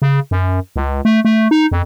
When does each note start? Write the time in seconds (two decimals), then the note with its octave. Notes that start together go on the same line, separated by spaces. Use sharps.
0.02 C#3
0.31 F#2
0.76 C#2
1.05 A3
1.25 A3
1.51 D#4
1.71 F2